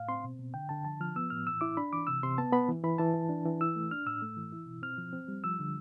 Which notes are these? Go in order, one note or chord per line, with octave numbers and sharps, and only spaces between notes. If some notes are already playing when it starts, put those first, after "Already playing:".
Already playing: A2 F5
C4 C6
B2
B2
D3 G5
D3 A5
F3 A5
F3 F6
B3 E6
A2 F6
E3 E6
E4 D6
D4 B5
E3 D6
C3 E6
C3 C6
B3 A5
B3 B5
E3
E3 B5
E3 A5
E3
D4
E3
E4 E6
A3
D4 F6
A2 E6
A3
E3
E4
B2
C4 F6
F3
C4
G3
F3 E6
D3